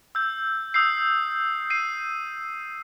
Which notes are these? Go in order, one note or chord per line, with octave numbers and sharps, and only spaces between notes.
E6 G6
D#6 E6 G6 C7
C7 D#7